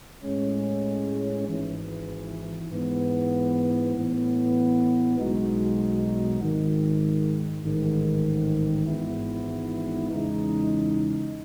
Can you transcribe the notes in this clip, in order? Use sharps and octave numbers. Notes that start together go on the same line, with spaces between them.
A2 G#3 C#4
G#1 G#2 E3
G#2 E3 B3
A2 E3 B3
B1 B2 G#3 D#4 F#4
G#1 G#2 D#3
A1 G#2 D#3
G#1 G#2 E3 B3 E4
E2 C#3 G#3 D#4